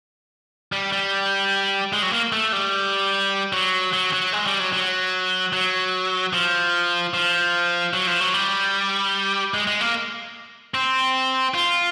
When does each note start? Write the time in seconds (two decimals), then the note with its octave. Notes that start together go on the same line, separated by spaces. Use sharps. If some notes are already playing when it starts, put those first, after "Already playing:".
0.72 G3
0.92 G3
1.93 G#3
2.03 F#3
2.13 A#3
2.32 A3
2.53 G3
3.53 F#3
3.93 F#3
4.13 F#3
4.33 G#3
4.47 G3
4.60 F#3
4.73 F#3
5.53 F#3
6.33 F3
7.14 F3
7.94 F#3
8.07 F3
8.20 F#3
8.34 G3
9.54 G#3
9.67 G#3
9.81 A#3
10.74 C4
11.54 F4